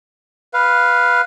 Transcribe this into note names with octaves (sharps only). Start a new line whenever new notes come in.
B4 F5